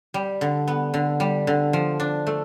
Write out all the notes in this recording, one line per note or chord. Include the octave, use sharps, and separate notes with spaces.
G3
D3
B3
D3
G3
D3
F3
D4
A3